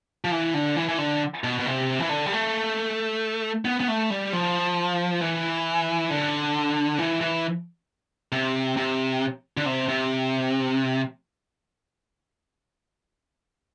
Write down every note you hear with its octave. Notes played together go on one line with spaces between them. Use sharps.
F3
E3
D3
E3
E3
D3
B2
B2
C3
E3
D3
G3
A3
B3
B3
A3
G3
F3
E3
D3
E3
E3
C3
C3
D3
C3
C3